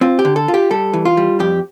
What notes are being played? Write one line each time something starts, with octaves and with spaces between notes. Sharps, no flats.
C4 F4
G4
D3
A4
F4
G4
G3 A4
E3
F4
G3
F2 G4